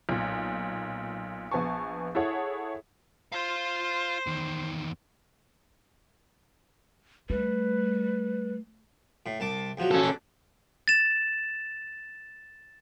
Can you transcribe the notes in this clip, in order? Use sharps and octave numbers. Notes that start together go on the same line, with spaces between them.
B1 A#2
A#1 B3 G#5 A5 C#6
E4 G#4 A4 C#5 F#5
F4 C5 F5
E2 D#3
G3 A3 B4
A2
C2 A5 D6
E2 F3 F#3
C#4 A4
D4
A6 E7